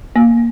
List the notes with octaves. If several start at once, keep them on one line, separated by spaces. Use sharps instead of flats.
A#3